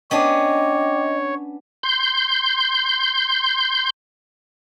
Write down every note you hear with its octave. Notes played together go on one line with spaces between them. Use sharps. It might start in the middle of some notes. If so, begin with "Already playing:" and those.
B3 C#4 D4 C#5 D#5 G5 D6
C6 G6